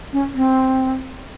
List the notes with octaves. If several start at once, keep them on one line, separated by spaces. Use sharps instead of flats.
C#4
C4